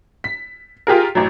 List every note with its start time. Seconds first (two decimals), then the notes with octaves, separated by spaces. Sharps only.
0.24 B6
0.87 F4 G4 G#4 A#4
1.15 A1 F#2 F#3